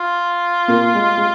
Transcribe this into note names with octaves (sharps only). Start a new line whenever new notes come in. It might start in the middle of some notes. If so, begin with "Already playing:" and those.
Already playing: F4
A#2 A#3
G#3
G#3